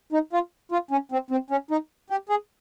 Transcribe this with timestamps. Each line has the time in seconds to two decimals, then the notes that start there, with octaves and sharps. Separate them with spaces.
0.12 D#4
0.33 F4
0.72 F4
0.91 C#4
1.12 C4
1.31 C4
1.50 C#4
1.71 D#4
2.10 G4
2.29 G#4